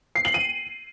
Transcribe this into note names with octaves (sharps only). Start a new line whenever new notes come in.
C7
F#7
D#7